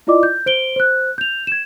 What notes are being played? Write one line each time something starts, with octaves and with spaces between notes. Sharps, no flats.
E4 F4 D5 D#5 D6
G6
C5 D7 G7
C5 F#6
G6 F7
G#6 E7